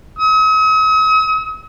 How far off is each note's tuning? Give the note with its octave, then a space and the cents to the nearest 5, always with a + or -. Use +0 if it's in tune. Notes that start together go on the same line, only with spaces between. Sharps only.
D#6 +45